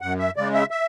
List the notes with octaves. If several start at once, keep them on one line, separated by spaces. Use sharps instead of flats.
F#2 F#5
E5
C#3 G#3 D5
E5
E5